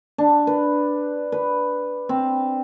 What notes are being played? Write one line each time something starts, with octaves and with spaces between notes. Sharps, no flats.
D4
B4
B4
C4